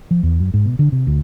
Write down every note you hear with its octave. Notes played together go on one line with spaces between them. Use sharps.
F3
E2
F#2
G#2
B2
D3
C3
D2